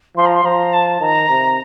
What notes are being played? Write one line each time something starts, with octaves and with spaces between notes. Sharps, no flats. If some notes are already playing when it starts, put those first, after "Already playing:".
F3 C6
A#5
C6
F3 A#5
A5
D#3 A#5
C3